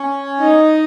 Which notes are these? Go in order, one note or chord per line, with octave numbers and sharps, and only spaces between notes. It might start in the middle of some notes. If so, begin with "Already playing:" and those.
Already playing: C#4 C#5
D#4 D#5